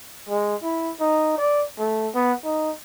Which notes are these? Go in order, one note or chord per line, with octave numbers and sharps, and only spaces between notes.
G#3
E4
D#4
D5
A3
B3
D#4